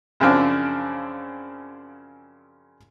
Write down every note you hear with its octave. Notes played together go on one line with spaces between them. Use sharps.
F#2 C#3 F3 C4 D4